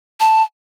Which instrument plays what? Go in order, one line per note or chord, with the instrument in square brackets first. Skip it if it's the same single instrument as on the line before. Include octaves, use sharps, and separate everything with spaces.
[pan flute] A5